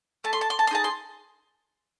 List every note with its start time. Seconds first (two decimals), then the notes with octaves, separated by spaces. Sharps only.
0.24 A3 A5
0.33 C6
0.41 A5
0.50 C6
0.59 A5
0.67 C6
0.71 D#4 G#4 A5
0.84 C6